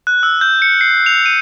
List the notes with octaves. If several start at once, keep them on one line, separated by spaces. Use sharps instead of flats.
F#6
E6
G6
C#7
C7
F7
D#7